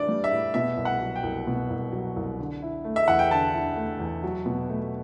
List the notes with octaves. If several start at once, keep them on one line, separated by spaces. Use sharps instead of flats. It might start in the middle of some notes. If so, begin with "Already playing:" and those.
Already playing: A2 E3 D4 D5
G3
E5
A2
B2 E5
C2
F#5
F#3
G5
C2
B2
C2
F#3
C2
D3
E4
A3
E5
E2 F#5
G5
D3 A5
E4
A3
E2
F#3
B2
A3